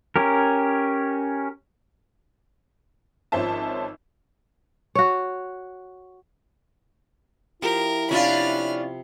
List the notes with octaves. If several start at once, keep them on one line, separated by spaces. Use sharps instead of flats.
C#4 G4 A#4
G#1 F3 C#4 C5 E5 A5
F#4 C#5
F3 E4 G4 A#4 F5
C3 F3 C#4 D4 F4 G#5 B5 F6